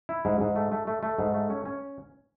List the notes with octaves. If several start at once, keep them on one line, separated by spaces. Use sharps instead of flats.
E4
G#2
G#2
A3
A3
A3
A3
G#2
A3
C#4
C#4